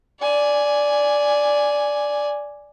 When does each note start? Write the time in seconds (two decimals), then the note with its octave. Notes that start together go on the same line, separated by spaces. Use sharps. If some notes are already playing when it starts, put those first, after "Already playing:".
0.20 D5 G#5